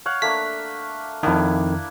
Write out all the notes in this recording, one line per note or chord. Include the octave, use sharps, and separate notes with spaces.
C#5 F5 F#5
A3 A#3 D4 B6
F2 D#3 A#3 D4 E4